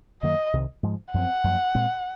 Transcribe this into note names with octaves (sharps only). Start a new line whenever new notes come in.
F#2 D#3 F#3 A#3 D#5
C2 C3 D#3
G#2 F3 G#3
F#2 F3 C4 F#5
F#2 F3 A#3
A#2 G#3 C4